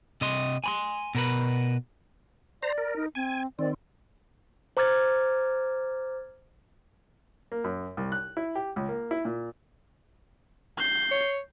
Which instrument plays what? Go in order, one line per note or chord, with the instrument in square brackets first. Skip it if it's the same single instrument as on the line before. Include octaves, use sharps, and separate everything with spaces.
[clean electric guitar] C3 D#5 C6
G#5 B5 C6
B2 A#4 B4
[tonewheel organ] C5 A#5 [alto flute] D5
[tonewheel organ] A#4
[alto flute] D#4
[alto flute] C4 [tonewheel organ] G#5
[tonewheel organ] D#3 C4 [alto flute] D5
[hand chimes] C5 A#5 D6 F6 G#6 A6
[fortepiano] A#3
F#2
C2
F#6
E4
G4
C#2
A#3
E4
A#2
[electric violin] G6 C7
[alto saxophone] C#5